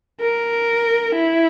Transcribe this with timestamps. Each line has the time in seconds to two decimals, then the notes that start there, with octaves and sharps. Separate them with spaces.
0.20 A#4
1.15 E4